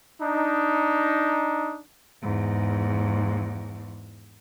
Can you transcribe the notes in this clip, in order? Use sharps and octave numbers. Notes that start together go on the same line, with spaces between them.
D4 D#4
E2 G#2